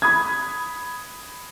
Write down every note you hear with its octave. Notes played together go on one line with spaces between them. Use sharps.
B5 D#6 G#6